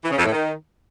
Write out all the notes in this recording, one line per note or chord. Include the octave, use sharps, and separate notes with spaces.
E3
C#3
F2
A2
D#3